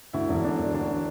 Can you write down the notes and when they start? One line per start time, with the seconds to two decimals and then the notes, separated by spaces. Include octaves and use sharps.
0.13 D2 E4
0.29 E1
0.44 D3 D4
0.59 E1
0.74 D2 D4